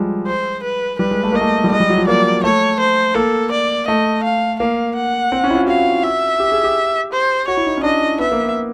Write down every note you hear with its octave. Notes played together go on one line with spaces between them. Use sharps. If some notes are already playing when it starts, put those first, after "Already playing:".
Already playing: F3 G3 G#3
C5
B4
G3 B4
G#3
A3
A#3 D#5
A3
G3
G#3 D#5
G3
F#3
F3
A#3 D5
A3 C#5
C5
A#3 A4
D5
A3 D#5
F5
A#3 F5
F#5
C4
C#4
E4
F4
F#4 F5
E5
G4
G#4
G4
C5
F#4 C#5
E4
D#4
C#4
D4 D#5
B3 E5
A#3
B3